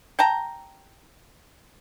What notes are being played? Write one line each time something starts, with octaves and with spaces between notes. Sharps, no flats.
G5 A5 A#5